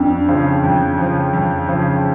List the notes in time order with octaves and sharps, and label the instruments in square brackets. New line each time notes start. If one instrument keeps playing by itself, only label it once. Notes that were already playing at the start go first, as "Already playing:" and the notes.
Already playing: [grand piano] F2 [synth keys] C4 D4
[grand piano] C#3 F3
F2
C#3 F3
F2
C#3 F3